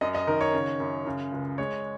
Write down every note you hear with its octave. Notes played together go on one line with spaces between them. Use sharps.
F#2 D#5
D#5
D#3 A#4
C#5
C#3
F#2
C#3
C#2
G#3 C#5